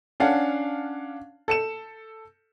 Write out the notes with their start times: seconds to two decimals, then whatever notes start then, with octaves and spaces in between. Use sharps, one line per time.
0.20 C#4 D4 F5 F#5 A5
1.48 A4 C#7 E7